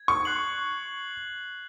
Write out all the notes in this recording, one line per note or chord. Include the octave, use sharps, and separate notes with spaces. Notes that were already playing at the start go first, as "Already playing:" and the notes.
Already playing: G#6
C#6
F#6 C7 F#7